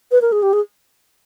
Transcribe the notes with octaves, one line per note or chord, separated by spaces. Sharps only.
B4
A#4
G#4
G4
G#4